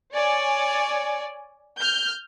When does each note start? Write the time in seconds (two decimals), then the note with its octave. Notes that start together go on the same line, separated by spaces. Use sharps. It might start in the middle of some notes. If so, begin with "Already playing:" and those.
0.13 C#5 D5 G#5
1.79 F6 G6